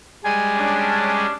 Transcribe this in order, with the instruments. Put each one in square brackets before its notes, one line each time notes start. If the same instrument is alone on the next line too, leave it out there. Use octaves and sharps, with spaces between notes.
[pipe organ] G3 G#3 G#4 [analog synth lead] G#5
[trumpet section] C#4 D4